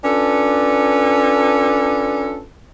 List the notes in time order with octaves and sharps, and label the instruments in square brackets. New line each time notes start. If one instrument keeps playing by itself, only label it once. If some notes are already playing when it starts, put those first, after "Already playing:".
[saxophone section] C#4 D4 F4 A4 B4